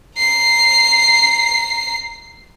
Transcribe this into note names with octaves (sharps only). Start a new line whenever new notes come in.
A#5 C7